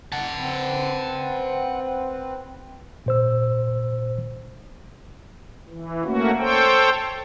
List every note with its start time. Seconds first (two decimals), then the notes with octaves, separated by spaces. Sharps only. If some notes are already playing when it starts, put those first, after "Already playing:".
0.12 F#5 A5
0.39 C4 B4
3.06 A#2 C5 E6
5.69 E3
6.04 A3 A#3 C#4 F#4
6.39 A4 C5 C#5 G5